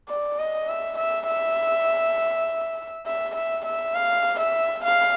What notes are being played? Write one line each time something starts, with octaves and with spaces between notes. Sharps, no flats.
D5
D#5
E5
E5
E5
E5
E5
E5
F5
E5
F5